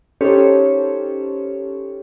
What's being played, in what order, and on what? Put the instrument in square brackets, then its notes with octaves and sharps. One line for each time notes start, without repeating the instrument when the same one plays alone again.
[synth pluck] C#4 D#4 G4 A4 C5 C#5